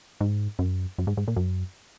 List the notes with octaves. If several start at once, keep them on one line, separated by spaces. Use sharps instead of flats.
G#2
F#2
F#2
G#2
G#2
A#2
F#2